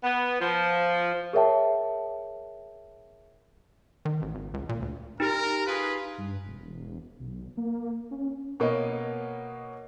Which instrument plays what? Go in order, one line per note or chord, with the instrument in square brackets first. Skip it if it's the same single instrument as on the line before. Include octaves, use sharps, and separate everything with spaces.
[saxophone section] B3
F3
[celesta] G#4 A#4 C#5 E5 G5 A5
[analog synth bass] D#3
A1
G#1
C#2
A#2
D2
[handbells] D#4 G4 [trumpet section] A#4
[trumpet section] F4 G#4 B4
[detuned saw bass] G2
E1
B1
A#3
C#4
[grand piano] B2 A#3 C#5 D#5